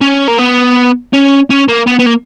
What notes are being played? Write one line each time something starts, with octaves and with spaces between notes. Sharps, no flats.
C#4
A#3
B3
C#4
C#4
A#3
B3
B3
A#3